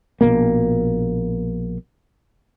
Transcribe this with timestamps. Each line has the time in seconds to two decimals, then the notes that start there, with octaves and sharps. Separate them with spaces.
0.21 A#1 D#2 B2 A#3